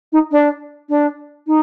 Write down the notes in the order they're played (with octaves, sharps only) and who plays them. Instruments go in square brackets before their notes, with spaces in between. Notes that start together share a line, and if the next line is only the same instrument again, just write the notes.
[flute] D#4
D4
D4
D#4